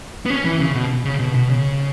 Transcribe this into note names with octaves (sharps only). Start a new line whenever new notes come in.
B3
C#4
E3
C#3
B2
C#3
B2
B2
C#3